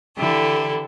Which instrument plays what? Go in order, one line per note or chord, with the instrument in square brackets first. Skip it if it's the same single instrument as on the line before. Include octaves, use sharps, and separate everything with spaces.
[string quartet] D3 E3 E4 G4 A4